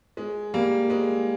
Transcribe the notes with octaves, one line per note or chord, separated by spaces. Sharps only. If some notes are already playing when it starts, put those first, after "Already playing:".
G#3
G3 A#3
G#3